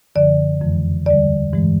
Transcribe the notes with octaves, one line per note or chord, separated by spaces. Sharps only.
F#2 D3 F3 D5
F2 C#3 E3 G#3
D#2 D3 G3 D5
G2 E3 G#3